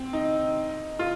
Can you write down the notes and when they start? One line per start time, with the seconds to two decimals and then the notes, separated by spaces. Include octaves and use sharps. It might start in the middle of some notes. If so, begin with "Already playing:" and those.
Already playing: C4
0.13 D#4
0.99 F4